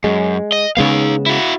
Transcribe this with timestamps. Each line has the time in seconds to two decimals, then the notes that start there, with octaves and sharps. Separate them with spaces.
0.04 F#2 G#3
0.52 D#5
0.77 C#3 G#3 B3 D#4 F5
1.26 E4 F#4